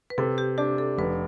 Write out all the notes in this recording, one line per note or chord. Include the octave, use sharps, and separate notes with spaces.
B4
C3 A4
G4
D4 G4
A4
F1 B4